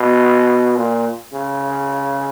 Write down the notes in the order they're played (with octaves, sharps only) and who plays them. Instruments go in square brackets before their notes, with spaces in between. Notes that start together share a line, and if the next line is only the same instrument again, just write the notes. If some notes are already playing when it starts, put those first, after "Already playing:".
Already playing: [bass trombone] B2
A#2
C#3